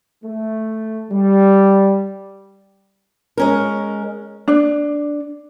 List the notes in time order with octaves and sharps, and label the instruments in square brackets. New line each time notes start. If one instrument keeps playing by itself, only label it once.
[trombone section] A3
G3
[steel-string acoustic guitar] G#3 C#4 A#4
[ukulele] D4